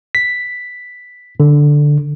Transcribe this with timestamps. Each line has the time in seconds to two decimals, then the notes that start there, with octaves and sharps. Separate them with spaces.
0.15 B6
1.40 D3